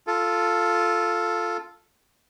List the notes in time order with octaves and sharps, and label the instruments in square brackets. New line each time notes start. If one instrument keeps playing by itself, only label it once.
[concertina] F4 A4